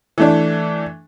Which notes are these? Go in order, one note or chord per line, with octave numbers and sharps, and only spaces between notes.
E3 A3 D4